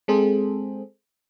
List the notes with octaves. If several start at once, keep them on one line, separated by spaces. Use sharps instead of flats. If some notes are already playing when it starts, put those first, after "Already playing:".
G#3 C4 G#4 A4 C5